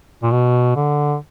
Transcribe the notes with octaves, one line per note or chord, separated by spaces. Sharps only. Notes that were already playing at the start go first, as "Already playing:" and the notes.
A#2
B2
D3